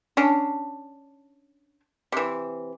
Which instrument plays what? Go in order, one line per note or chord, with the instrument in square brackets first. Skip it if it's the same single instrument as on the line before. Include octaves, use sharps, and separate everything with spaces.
[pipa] C#4 D4
C3 E3